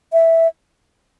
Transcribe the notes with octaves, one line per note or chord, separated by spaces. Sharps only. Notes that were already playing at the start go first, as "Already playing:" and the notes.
E5